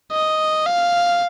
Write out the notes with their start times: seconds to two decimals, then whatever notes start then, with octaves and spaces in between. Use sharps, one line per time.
0.13 D#5
0.67 F5